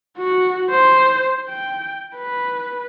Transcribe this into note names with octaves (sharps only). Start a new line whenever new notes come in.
F#4
C5
G5
B4